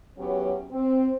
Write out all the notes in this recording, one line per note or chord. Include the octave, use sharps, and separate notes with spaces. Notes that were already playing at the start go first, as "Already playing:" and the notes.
E2 F#3 B3 C#4 G4
C4